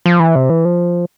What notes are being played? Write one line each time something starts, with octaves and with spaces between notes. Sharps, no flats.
F3
E3
C3
E3
F3